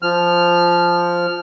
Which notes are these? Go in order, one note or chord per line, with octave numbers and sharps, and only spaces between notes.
F3 F6